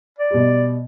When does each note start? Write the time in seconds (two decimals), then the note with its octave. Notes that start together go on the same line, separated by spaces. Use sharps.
0.18 D5
0.30 B2 G3